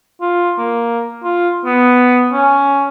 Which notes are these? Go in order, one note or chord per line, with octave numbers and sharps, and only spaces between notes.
F4
A#3
F4
B3
C#4